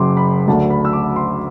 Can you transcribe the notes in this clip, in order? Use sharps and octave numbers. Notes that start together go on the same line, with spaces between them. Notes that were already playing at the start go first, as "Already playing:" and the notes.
Already playing: F#1 F#2 F#3 C6 D6
B5
D2 D3 F#3 A5
B5
E6
D6
C6